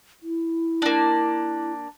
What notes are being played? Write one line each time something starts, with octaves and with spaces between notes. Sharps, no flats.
E4
A#3 D4